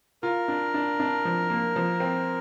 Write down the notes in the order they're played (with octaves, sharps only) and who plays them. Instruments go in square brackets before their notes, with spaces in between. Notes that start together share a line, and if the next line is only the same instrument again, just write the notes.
[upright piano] F4 [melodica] A#4
[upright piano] D4
D4
D4
F3
A#3
F3
C4